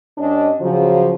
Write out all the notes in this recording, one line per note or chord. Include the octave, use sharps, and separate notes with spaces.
G2 C#4 D4 D#5
C#3 F3 F#3